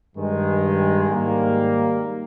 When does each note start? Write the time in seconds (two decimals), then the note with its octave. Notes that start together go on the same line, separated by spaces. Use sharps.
0.16 G2 D#3 G#3
1.09 G#2 D#3 G3 A#3